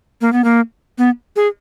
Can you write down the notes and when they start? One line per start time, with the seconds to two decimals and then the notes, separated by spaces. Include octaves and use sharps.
0.21 A#3
0.33 B3
0.44 A#3
0.98 B3
1.36 G#4